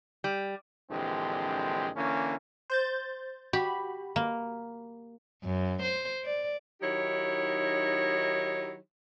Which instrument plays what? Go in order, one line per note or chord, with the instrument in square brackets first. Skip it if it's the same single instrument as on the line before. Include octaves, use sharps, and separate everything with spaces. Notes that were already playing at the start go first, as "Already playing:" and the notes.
[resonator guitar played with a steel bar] G3
[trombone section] A#1 D3 E3 G#3 C4 G4
D3 E3 A#3 C#4
[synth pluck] C5 G6 A6
[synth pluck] F#4 B5 [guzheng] G4
[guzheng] A#3
[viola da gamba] F#2
C5
D5
[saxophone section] D#3 F#3 D#4 E4 G4 C#5